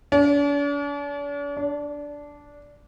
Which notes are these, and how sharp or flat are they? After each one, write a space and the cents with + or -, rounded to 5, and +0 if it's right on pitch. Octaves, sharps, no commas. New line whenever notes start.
D4 -45
D4 -10